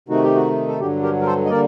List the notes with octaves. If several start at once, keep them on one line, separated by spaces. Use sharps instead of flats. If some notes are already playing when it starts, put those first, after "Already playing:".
C3 D#3 A3 D#4 F#4
G4
F#4
A4
G2 D3 F#3 G4
G4 A#4
A#4
A4 C5
D#5
D3 G3 A#3 A#4 D5